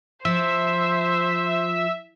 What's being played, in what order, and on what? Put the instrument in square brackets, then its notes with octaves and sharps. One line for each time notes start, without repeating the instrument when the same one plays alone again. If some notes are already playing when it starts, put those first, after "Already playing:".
[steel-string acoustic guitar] F3 [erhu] C5 [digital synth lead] E5